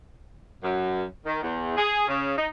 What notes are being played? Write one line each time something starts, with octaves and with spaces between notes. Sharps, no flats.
F#2
D#3
E2
G#4
C#3
D#4